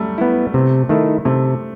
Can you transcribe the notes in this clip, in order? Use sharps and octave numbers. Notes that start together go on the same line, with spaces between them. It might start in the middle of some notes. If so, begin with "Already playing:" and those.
Already playing: F#3 G3 A3
B3 E4
C3
D#3 A3 E4
C3 A3